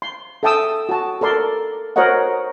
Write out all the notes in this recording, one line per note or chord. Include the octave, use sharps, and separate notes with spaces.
C6
A4 E5 G5 A5 D#6 E6
F#4 A5
A4 A#4 D5 C6
F#4 A#4 C5 C#5 D#5 F#5